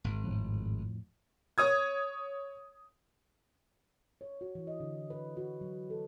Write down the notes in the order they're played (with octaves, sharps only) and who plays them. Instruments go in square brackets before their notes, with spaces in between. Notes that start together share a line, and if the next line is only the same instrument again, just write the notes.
[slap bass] G#1
[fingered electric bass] F2 A2 F3
[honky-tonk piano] C#5 D#6 G#6
[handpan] C#5
F#4
E3
D#5
D3
B4
F#4
F#3
A4